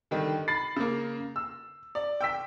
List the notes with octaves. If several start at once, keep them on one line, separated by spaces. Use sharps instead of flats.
D3 D#3 G3
B5 A6 C7
C#3 A#3
E6
D5
G5 E6 B6